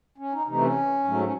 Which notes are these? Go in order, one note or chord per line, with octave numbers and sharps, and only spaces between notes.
C#4
D#4
C3 E3 A3 D#4
C#4
G#2 F#3 A3
C#4